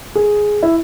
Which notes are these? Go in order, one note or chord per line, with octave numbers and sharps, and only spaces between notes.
G#4
E4